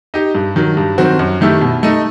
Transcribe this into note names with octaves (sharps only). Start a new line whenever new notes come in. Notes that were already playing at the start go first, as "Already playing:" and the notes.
D#4 G4
G2
D#3 F#3
G2
D#3 F#3 C4 F#4
F#2
D#3 A3 E4 G4
B2
A3 D#4